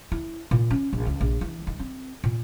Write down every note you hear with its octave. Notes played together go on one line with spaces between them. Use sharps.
E4
A#2
C#4
A#1
C#2
A#1
E3
D#3
C4
A#2